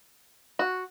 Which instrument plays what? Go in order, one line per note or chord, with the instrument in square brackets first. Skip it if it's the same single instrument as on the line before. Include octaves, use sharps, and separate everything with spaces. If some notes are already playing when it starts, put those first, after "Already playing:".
[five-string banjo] F#4